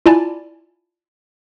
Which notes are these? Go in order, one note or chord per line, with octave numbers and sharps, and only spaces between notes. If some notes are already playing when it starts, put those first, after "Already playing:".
E4 F4 D5 G#5 A5